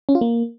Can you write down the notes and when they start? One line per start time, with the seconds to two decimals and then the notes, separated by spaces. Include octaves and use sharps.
0.09 C#4
0.15 F4
0.21 A#3